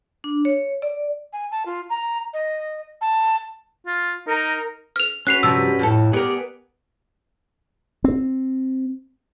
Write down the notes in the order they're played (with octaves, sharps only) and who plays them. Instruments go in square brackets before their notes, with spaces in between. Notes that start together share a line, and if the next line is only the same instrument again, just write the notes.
[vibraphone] D4
C#5
D5
[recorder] G#5
A5
F4
A#5
D#5
A5
[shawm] F4
[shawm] D#4 [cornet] A#4
[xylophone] F6 F7
[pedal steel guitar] C#4 F#4 B4 [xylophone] F#6 C7 F7
[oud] G2 C3 F3 [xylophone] E6
[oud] F2 A4 [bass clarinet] A2
[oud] B3 A#4 [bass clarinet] G4 [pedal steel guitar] G#4 D5
[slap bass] C4